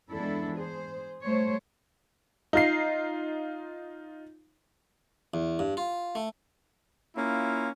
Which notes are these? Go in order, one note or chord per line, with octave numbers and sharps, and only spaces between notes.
E2 G#3 D4 E4 A4
G#4 C5
G3 A3 C5 C#5
D#4 F4 C7
E2
G2
F4
A3
A#3 C#4 E4 F4